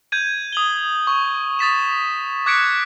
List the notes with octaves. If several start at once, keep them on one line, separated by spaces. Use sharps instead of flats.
G6 G#6 D#7
D#6 F#7 G7
C#6
D#6 A6 B6 E7
D6 F#6 G#6 B6 C#7 D7